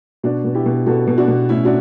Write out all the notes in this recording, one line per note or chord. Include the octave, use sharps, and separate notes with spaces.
B2 D4 F#4
B2
E4 G4
B2
B2 F#4 A4
B2
D4 F#4
B2
A2 C#4 E4
D4 F#4